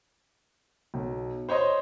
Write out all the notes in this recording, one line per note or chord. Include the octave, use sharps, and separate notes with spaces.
B1
C5 C#5 D#5 C6